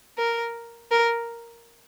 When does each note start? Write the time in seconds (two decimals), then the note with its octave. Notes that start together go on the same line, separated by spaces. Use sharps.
0.18 A#4
0.91 A#4